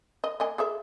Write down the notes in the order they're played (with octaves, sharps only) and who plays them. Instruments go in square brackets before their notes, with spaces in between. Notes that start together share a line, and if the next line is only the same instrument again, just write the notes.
[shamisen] D#5
A#3 D#5 G#5
G#4 A4 E5